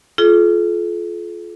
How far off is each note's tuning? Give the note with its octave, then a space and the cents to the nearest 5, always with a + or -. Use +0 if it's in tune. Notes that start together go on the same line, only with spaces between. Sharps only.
F4 +0 A4 -45